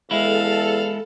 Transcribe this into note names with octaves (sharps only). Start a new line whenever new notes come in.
E2 G#3 E4 A4 F5